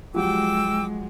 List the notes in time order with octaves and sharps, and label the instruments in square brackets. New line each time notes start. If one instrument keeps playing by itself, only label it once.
[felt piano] F3 F#3 G4 [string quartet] G#3 [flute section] G5 D6 E6